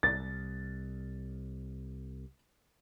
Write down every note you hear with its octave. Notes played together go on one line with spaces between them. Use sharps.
C2 A6